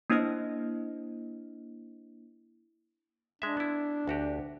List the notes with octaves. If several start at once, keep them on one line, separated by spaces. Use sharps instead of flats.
A#3 D4 E4 C5 D#5 F6
G#3 D4 E5
B3 E4
D2 F#4 G4